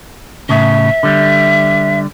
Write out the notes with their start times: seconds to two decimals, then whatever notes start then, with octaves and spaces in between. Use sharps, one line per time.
0.49 A2 C#3 E5
1.03 D3 G3